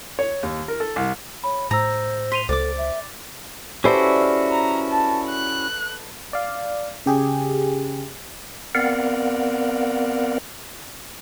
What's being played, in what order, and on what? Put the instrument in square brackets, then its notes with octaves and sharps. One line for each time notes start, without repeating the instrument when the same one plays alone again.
[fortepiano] C#5
D#2
A#4
A4
C2
[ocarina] C#5 [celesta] B5
[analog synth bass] A2 [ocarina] C5 [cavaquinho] A#5 [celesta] E6 A#6
[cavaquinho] C6 [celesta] B6 D#7 F7
[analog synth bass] C#2 [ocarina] A4 [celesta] C5 [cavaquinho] D5 D6
[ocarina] E5
[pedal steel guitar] C#4 E4 F#4 [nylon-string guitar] G4 C5 [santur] A4 B4 D5
[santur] F5 E6
[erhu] A#5
A5
F#6
[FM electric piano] D5 F5
C#3 G4 G#4
[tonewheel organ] B3 C4 A#4 D5 F5 F#5